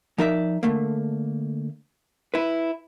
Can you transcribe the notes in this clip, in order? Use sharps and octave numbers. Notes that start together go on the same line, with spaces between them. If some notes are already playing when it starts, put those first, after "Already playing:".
F3 D#4 A#4 D5 E5
D3 A3 A#3
E4 B4